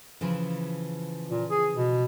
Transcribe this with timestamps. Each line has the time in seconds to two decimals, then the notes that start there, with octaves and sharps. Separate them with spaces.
0.21 C#3 E3 F3
1.31 A#2
1.51 G#4
1.75 B2